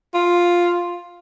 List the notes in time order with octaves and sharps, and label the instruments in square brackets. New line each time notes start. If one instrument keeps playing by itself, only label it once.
[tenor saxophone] F4